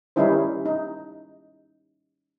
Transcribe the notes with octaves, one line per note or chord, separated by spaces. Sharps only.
D#3 G3 C#4 D#4 E4 C5
D#4